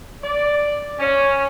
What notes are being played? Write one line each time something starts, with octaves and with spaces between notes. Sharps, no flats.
D5
C#4